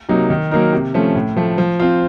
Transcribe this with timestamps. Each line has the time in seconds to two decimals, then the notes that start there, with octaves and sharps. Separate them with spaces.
0.09 C3 F#3 A#3 D#4
0.30 D#3
0.51 F#3 A#3 D#4 A#4
0.73 C3
0.94 F3 A3 C#4
1.15 A2
1.37 F3 A3
1.58 F3
1.80 C4 F4